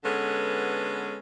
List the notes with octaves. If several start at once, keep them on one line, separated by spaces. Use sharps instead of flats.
D3 G#3 B3 C#4 A4 B4